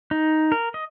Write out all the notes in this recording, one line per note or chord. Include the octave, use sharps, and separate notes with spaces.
D#4
A#4
D#5